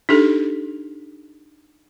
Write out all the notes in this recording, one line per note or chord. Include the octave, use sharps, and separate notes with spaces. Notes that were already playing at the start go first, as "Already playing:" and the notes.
D4 D#4 G4 A4